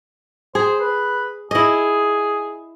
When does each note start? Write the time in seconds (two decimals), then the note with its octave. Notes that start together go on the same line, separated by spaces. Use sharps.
0.55 G#4 C5
0.80 B4
1.51 E4 G#4 D#5